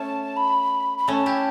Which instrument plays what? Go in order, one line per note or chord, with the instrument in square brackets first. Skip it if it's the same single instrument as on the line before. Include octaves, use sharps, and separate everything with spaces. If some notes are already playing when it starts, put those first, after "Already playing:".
Already playing: [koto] A3 C#4 [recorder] A5
[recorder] B5
B5
[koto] A3 C#4 [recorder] A5
[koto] E4 G4